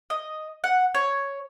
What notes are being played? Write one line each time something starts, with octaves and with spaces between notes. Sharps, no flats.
D#5
F#5
C#5